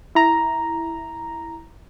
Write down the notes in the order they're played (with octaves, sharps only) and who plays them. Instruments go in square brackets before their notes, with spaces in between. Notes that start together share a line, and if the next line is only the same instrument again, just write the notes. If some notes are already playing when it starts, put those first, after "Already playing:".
[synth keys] E4 A#5